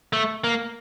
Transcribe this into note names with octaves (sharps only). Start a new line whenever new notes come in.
A3
A#3